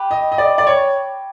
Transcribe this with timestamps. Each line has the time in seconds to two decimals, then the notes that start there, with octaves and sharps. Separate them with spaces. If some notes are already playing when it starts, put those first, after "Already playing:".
Already playing: G4 B4
0.11 D#5
0.32 D#5
0.38 D5
0.58 D5
0.67 C#5